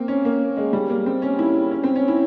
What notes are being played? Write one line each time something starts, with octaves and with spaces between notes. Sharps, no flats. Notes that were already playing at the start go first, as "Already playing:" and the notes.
Already playing: A#3 C4
C#4
A#3
G#3
G3
A#3
C4
C#4
E4
C#4
C4
C#4
E4